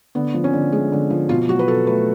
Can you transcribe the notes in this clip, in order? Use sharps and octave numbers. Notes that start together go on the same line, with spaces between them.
D3 B3
F3
C#4
D3
G#3
D3
F3
B2 F4
F#3 F#4
B4
B2 A4
A3 B4